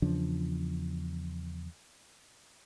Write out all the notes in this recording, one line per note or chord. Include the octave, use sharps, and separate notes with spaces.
E2 C#3 F3 D4